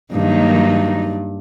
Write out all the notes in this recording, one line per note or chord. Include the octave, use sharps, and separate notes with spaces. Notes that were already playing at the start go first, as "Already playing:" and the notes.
G2 D#3 F#3 A#3 D#4